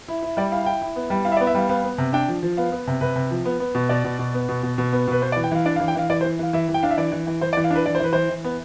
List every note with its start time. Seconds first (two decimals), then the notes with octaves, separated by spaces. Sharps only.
0.08 E4
0.23 E4
0.37 G3 D5
0.52 E4 F5
0.63 F5
0.66 E4 G5
0.82 E4
0.96 B3
1.10 G3
1.25 E4 F5
1.32 E5
1.37 D5
1.41 B3
1.47 E5
1.54 G3 F5
1.69 B3 F5
1.84 B3
1.98 C3
2.13 D4 G5
2.28 F3
2.43 F3
2.57 B3 F5
2.72 B3
2.87 C3
3.01 C3 B4
3.16 C3
3.31 F3
3.45 B3
3.60 B3
3.75 B2
3.89 B2 D5
4.04 B2
4.19 B2
4.34 B3
4.49 B2
4.63 B2
4.78 B2
4.93 B3
5.08 B2 B4
5.22 B3 C5
5.32 D5
5.36 E3
5.44 G5
5.52 E3 F5
5.65 D4 D5
5.76 F5
5.80 E3
5.88 G5
5.96 E3 F5
6.10 E3 D5
6.21 C5
6.25 E3
6.39 E3 F5
6.53 E3 E5
6.69 E3
6.74 G5
6.83 D4 F5
6.91 E5
6.97 E3 D5
7.12 E3
7.27 E3
7.41 E3 C5
7.53 D5
7.57 E3
7.64 F5
7.71 D4 B4
7.86 E3 D5
7.95 C5
8.00 E3 B4
8.13 E3 C5
8.30 E3
8.44 B3